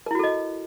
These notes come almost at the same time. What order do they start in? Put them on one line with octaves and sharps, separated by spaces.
A#4 E4 F#4 A4 D#5